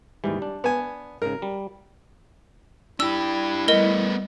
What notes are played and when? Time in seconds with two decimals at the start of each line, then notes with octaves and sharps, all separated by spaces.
0.24 D#2 G#2 E3 G3
0.42 D4
0.64 B3 G#5
1.22 G#2 C#3 A#4
1.42 G3
3.00 D4 E4 G4 E6
3.68 G3 A3 B3 A#4 D#5